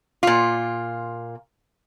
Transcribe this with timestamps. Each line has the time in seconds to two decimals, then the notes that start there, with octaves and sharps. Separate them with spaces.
0.23 A#2 F4